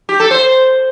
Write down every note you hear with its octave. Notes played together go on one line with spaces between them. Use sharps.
G4
A4
C5